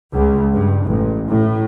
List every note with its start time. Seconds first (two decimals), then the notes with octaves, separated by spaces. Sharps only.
0.13 C#2
0.53 G2
0.86 A1
1.29 A2